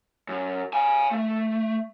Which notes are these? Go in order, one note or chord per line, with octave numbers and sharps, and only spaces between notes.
F#2
F5 G#5
A3